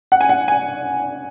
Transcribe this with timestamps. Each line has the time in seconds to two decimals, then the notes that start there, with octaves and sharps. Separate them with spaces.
0.12 F#5
0.21 G#5
0.29 F#5
0.48 G#5